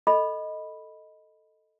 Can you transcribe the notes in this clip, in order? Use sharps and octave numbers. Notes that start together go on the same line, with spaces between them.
A4 D#5 B5